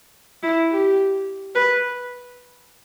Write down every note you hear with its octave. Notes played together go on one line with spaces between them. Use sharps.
E4
G4
B4